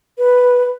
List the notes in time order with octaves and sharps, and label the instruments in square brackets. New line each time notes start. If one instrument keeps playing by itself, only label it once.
[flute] B4